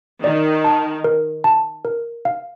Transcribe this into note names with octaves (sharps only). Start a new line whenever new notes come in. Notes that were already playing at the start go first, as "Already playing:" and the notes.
D#3 D5
A5
A#4
A5
A#4
F5